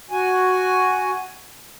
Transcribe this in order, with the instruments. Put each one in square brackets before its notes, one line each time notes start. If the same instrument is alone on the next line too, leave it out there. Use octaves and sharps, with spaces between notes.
[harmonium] F#4 G#5